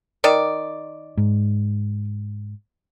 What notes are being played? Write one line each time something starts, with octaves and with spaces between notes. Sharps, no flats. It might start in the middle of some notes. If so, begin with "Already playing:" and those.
D#3 D5
G#2